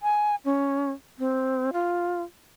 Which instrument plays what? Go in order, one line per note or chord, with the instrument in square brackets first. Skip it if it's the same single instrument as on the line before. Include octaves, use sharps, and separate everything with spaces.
[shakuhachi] G#5
C#4
C4
F4